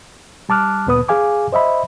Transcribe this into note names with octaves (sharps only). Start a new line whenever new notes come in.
G3 A5 D6 F6 F#6
D2 A#2 B3 B4 D#6
G#4 F5 G#5 D6
C5 D#5 E5 B5